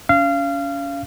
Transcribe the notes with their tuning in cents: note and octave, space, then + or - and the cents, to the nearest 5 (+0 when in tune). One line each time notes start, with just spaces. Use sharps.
C#4 +35 F5 -25